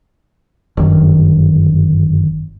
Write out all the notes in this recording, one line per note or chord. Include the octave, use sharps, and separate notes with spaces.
G1 F#2 D#3